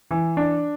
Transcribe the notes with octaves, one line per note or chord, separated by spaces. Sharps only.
E3
D4